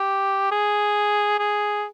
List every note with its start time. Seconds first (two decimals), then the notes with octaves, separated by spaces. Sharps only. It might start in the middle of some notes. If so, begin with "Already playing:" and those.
Already playing: G4
0.52 G#4
1.39 G#4